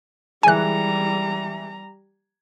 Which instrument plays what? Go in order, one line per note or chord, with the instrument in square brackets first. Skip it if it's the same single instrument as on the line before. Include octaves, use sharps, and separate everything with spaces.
[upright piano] E3 G#3 [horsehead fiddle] G3 A#5 [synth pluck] G#5 F#6